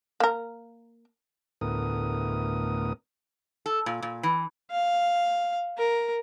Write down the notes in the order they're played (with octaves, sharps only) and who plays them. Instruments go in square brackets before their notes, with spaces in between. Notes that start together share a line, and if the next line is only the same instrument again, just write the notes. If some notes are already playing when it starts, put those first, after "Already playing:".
[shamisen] A#3 A#4
[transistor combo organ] D2 A2 B3 A#4 D#6
[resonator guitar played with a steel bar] A4
A#2
A#2
E3
[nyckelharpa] F5
A#4